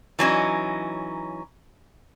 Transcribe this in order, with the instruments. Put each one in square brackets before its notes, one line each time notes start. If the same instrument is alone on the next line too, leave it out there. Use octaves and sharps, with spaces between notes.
[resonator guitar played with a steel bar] E3 F#3 C#4 D#4